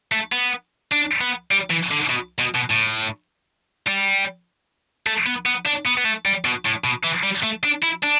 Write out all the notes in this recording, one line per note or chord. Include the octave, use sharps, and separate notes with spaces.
A3
B3
D4
B3
G3
E3
D3
B2
B2
B2
A2
G3
A3
B3
B3
D4
B3
B3
A3
G3
B2
A2
B2
E3
G3
A3
D4
E4
D4